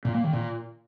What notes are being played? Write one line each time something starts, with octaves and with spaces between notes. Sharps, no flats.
A#2
A#3
D#3
A#2